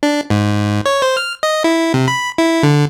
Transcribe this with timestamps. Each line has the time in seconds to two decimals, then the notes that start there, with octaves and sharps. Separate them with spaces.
0.03 D4
0.30 G#2
0.86 C#5
1.02 C5
1.17 F6
1.43 D#5
1.64 E4
1.94 C3
2.08 B5
2.38 E4
2.63 D3